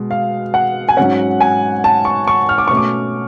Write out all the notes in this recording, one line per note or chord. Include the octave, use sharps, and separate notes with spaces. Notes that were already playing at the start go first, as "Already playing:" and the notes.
Already playing: B2 G#3
F5
F#5
G#5
G#2 F#3 C#4 F#5
G#5
A5
C#6
C#6
F6
D6
B2 A3 C#4 C#6
D6